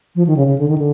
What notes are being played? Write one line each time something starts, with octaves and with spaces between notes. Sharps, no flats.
F3
D#3
C#3
C#3
D3
D#3
D3